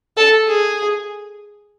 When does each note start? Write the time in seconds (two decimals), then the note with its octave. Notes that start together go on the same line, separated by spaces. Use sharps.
0.17 A4
0.47 G#4